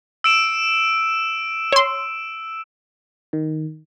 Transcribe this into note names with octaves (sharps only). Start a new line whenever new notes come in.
E6 D7 E7
C#5 C6
D#3